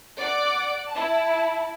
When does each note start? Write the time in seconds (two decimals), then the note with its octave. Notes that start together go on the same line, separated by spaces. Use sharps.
0.19 D5 F#5 D6 D7
0.90 E4 A5